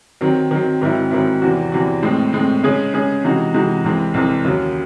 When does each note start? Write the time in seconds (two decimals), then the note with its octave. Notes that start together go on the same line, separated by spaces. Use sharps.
0.21 D#3 F#3 C4
0.51 D#3 F#3 C4
0.82 G#2 D#3 F#3 C4 E4
1.11 G#2 D#3 F#3 C4 E4
1.42 E2 C3 E3 C4 F#4
1.72 E2 C3 E3 C4 F#4
2.03 A2 G#3 C4
2.33 A2 G#3 C4
2.63 C#3 G#3 C#4 G#4
2.94 C#3 G#3 C#4 G#4
3.24 C3 E3 G#3 D#4 F#4
3.54 C3 E3 G#3 D#4 F#4
3.84 C2 C3 E3 G#3 C4
4.14 C2 C3 E3 G#3 C4
4.44 D#2 C#3 F#3